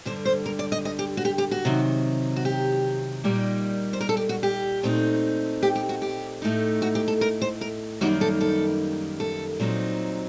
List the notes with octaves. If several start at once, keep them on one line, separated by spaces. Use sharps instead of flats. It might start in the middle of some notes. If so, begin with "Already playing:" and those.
G2 D3 G3 C5
C5
A#4
D5
D#5
D#5
G4
F#4
G4
G4
F#4
C3 D#3 F#3
F#4
G4
A#2 G3 A#3 D#4
C5
A#4
A4
G4
F#4
G4
A#2 A3 C4 D#4
G4
G4
F#4
G4
A2 A3 D#4
F#4
G4
A4
A#4
C5
A#4
F#2 D#3 G3 A#3 D#4 F#4
A4
A4
A4
A#2 F#3 C4 D#4